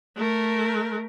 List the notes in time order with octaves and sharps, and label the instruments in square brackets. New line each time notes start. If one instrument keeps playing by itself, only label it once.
[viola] A3 A#4